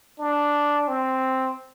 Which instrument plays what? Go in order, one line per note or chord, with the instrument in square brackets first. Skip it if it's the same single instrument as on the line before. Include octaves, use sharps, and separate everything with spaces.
[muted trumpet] D4
C4